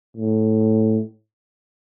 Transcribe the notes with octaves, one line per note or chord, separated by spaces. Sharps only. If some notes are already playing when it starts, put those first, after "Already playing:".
A2